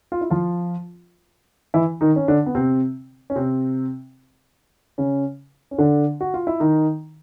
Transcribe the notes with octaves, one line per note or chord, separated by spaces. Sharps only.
F4
E4
F3 F4
E3 E4
D#3 D#4
C#4
D3 D4
B3
C3 C4
C#4
C3 C4
C#3 C#4
C#4
D3 D4
F#4
F4
E4
D#3 D#4